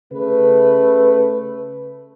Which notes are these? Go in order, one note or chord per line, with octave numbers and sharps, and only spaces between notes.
C#3 A3 B4